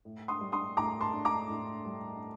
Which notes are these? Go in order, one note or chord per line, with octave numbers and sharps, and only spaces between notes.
A2
C6 D#6
G3
C6 D#6
A2 A#5 D6
A5 C6
D4
A#5 D6
A2
G3